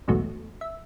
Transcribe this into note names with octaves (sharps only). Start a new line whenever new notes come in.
B1 E2 G#2 B2 F#3 A3
E5